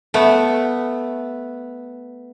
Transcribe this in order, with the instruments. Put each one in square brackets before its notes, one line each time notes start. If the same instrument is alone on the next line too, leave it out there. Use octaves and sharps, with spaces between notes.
[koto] A3 B3